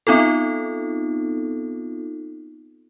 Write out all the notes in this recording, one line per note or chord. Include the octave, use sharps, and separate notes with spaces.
B3 C4 D#4 F4 A4